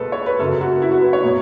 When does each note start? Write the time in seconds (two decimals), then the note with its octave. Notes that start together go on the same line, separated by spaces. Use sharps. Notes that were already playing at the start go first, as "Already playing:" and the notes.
Already playing: C#2 B2 A4 B4
0.12 C#5
0.26 B4
0.39 F#2 C#3 F#3 A4
0.61 F#4
0.82 E4
0.92 F#4
1.02 B4
1.13 C#5
1.23 B2 F#3